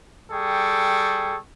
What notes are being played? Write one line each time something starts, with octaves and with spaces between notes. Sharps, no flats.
G3 G#4 A4 G5 C#6